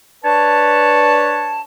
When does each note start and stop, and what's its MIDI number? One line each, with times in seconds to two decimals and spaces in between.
0.25 1.62 62
0.25 1.62 71
0.25 1.62 73
0.25 1.62 81